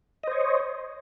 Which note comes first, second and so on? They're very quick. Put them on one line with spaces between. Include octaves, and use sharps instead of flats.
D#5 C5 C#5